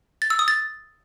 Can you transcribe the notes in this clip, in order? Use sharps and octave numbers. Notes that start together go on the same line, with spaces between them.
A6
E6
D#6
A6